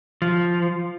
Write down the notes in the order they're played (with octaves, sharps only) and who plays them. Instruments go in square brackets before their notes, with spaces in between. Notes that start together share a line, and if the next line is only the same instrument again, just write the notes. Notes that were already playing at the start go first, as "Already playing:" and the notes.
[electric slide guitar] F3